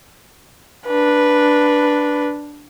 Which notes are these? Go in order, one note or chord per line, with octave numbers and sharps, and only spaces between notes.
D4 B4